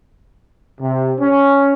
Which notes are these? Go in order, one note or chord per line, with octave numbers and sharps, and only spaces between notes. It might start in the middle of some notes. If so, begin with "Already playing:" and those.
C3
C#4